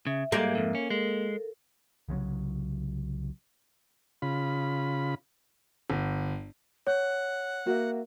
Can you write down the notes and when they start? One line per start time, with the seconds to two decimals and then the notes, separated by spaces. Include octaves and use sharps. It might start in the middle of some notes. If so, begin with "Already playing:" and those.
0.07 C#3 E5
0.32 G#2 G3 G#3 A#3
0.55 F2 G#2
0.75 C#4
0.90 G#3 A4 A#4
2.09 C2 C#3 F3 F#3
4.22 C#3 F4 B5
5.90 G1
6.87 C#5 F#5
7.66 A#3 F#4 E5